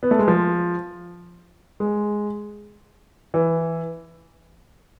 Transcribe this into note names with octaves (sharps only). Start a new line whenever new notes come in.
B3
A3
G#3
F3
G#3
E3